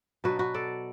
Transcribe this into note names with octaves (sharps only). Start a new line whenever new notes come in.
B2 F#3 D4 F#4 B4
F#4 B4
A4 D5